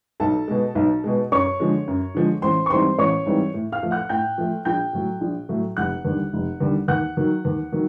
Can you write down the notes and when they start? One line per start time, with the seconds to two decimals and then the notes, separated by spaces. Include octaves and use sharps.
0.20 B1 A4 A5
0.48 B2 G#3
0.75 B1
1.04 B2 G#3
1.32 F#2 C#5 C#6
1.60 D3 F3 G#3
1.88 F#2
2.15 D3 F3 G#3
2.42 A1 C5 C6
2.66 C#6
2.70 G#2 E3 G3 C4 C5 C6
2.98 A1 C#5 C#6
3.26 G#2 E3 G3 C4
3.54 A2
3.72 F5 F6
3.83 F3 A3
3.91 F#5 F#6
4.09 A2 G5 G6
4.38 F3 A3
4.65 A#1 G5 G6
4.93 A2 F#3 A3
5.21 A#1
5.49 A2 F#3 A3
5.77 F1 F#5 F#6
6.05 D#2 D3 G3
6.33 F1
6.60 D#2 D3 G3
6.88 D#2 F#5 F#6
7.17 D#3 F#3
7.45 D#2
7.72 D#3 F#3